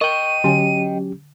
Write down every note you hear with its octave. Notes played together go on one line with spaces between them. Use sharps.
A#4 D#5 G5 C#6 D#7
D3 F#3 C#4 G4 G#5